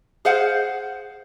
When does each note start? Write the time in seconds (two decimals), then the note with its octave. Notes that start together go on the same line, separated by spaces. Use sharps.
0.25 G#4 C5 F5 F#5